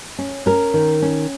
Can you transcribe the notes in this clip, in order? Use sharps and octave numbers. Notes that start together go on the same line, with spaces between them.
C#4
C#4 A#4
D#3
C#4